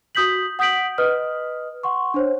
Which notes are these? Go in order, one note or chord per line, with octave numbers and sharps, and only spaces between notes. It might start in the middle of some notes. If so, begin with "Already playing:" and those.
F#4 D#6 G6 B6 F#7
F#5 D#6 G6 B6 D7 F#7
B4 D#5 D#6 F6
F#5 C6 C#6
D4 C5 C#5